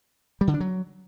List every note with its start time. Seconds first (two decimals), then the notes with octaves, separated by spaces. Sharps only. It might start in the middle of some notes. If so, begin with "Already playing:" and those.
0.41 G3
0.47 D3
0.54 D4
0.60 F#3